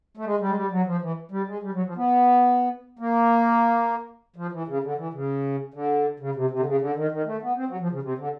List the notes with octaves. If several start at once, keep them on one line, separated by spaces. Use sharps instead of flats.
A3
G#3
G3
G#3
G3
F#3
F3
E3
G3
G#3
G3
F#3
F3
B3
A#3
F3
E3
C#3
D3
E3
C#3
D3
C#3
C3
C3
D3
C#3
D3
D#3
D#3
A3
B3
C4
F#3
F3
C#3
C3
D3